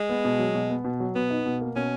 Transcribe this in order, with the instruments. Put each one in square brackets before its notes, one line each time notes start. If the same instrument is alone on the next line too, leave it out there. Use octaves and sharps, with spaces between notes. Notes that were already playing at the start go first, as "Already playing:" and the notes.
Already playing: [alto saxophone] G#3
[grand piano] B3
B2
F#3
B2
B3
B2
F#3
[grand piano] B2 [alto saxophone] B3
[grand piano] D#4
B2
A#3
[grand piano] B2 [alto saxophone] C#4